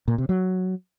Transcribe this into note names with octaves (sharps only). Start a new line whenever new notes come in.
A#2
C3
F#3